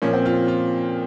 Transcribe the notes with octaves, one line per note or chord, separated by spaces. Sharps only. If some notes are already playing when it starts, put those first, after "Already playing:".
A#2 F3 C#4
C4
F4
F4